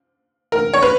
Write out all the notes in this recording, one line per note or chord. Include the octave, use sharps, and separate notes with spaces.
A#4
C#5
B4